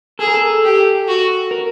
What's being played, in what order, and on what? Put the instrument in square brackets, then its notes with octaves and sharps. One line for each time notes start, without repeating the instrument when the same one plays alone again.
[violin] G#4 [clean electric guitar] A4
[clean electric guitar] A#4
A4
[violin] G4
F#4
[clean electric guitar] A#4